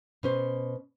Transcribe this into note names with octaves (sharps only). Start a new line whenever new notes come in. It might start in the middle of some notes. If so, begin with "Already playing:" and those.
B2 C#4 C5